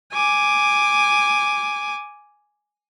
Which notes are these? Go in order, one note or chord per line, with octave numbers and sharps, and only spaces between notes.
G#5 D6